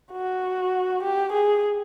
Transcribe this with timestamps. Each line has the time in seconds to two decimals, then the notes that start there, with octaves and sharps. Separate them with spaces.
0.12 F#4
1.03 G4
1.32 G#4